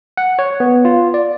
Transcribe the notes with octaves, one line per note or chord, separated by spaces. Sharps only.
F#5
C#5
B3
F4
D5